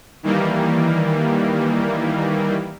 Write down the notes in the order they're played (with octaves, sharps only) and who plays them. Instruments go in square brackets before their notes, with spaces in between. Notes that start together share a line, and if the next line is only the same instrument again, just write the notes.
[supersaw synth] D#3 E3 G3 A#3